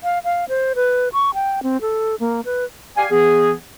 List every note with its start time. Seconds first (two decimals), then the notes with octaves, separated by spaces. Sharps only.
0.04 F5
0.24 F5
0.49 C5
0.75 B4
1.13 C#6
1.34 G5
1.63 C4
1.81 A4
2.20 A#3
2.45 B4
2.97 G4 D5 F5 G#5
3.11 E3 B3 G#4